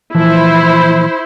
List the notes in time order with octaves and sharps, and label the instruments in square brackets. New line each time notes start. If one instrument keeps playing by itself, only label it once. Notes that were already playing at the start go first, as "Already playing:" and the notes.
[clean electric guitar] A#2 E3 F3 [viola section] E4 C5